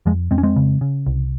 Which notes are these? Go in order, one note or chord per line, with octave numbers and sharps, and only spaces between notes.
F2 F3 G#3
F2 G#3 C4
C#4
G#3 C4
C#3
C#3
C2